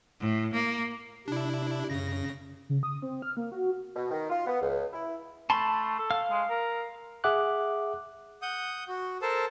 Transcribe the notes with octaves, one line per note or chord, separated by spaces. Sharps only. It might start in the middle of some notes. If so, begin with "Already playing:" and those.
A2
A#3
C3 D4 E4
F#2 C#3 A#6
C#3
D#6
C4
F6
A#3
F#4
B2
D#3
F4
B3
C#2
E4
A3 A5 B5 C6
A4
F5 F6
G#3
A#4
G#4 E5 F#5 D6 F#6
F#5 D#6 G6
F#4
A4 A#4 C5 A5